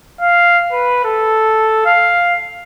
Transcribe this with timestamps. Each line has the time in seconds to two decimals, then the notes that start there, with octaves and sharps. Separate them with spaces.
0.21 F5
0.72 B4
1.05 A4
1.86 F5